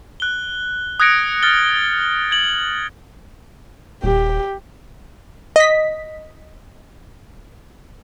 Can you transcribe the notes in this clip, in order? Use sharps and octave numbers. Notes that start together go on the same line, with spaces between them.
F#6 G7
D#6 F#6 G#6 A#6 C#7 D7
F6 A6 G7
G#6 F#7
D#1 G4
D#5 B6